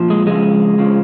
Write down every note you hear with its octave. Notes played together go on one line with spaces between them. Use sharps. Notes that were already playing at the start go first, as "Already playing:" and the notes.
Already playing: A#2 F3
G#3
F2 C#3 F3 G#3
F2 C#3 F3